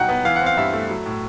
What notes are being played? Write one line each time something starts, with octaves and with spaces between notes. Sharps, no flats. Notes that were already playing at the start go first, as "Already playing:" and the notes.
Already playing: B2 F#3 D#4 F#5 G5
B3
E3 F5
F#5
C4 F5
G2 E5
A3
F#3
A2